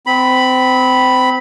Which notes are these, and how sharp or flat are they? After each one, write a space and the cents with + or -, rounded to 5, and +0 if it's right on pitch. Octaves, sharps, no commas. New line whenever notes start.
C4 -25 B5 +0